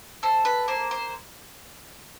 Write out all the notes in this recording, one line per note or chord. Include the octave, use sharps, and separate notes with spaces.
A4 C5
B4
A#3 C5
C5